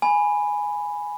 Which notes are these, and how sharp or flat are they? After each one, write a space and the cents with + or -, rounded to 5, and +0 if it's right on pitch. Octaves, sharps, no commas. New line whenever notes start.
G#5 +0 B5 +0